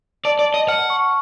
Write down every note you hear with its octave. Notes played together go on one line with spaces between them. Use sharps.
D5 A5
D5
A5
D#5
F#5 F6
C#6